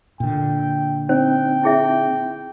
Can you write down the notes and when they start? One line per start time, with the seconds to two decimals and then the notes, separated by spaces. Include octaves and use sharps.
0.20 A#2 D3 G5
1.09 C4 D#4 C5 G5
1.64 E4 G#4 E5